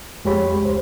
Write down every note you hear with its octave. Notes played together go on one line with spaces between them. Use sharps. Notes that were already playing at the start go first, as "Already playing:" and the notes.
F2 G#3 G4 C#5 B5
C#2 C5